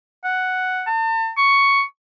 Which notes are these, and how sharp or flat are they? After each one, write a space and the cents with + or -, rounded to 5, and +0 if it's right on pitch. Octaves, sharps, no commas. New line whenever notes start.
F#5 +0
A5 +40
C#6 +5